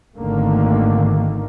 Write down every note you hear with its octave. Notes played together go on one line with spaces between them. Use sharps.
G#1 D3 D#3 A3 A#3